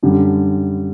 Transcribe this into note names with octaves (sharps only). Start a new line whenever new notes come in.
F#2 D3 G3